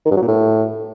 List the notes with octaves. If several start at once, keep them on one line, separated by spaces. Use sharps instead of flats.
D#3
G2
F#3
A#2
A2